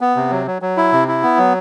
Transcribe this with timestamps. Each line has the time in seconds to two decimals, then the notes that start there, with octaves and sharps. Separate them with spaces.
0.01 B3
0.16 C3
0.31 F#3
0.47 F#3
0.62 F#3
0.77 E4
0.93 C3
1.08 E4
1.23 B3
1.38 F#3